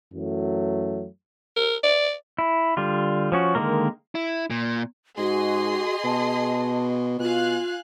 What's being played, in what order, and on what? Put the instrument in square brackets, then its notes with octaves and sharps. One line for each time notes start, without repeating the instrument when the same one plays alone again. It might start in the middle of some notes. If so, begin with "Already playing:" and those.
[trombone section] F#2 E3 F#3 A3
[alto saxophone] A#4
D5
[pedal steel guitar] E4
D3 G3 F4
F3 C#4 F#4
D3 D#3 G#3 A#3 A#4
[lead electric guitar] E4
A#2
[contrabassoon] G#2 [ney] F#4 [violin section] G#4 D#5 C6
[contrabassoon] B2 [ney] A5
[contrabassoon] B2 [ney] F4 [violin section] F5 G#5 F#6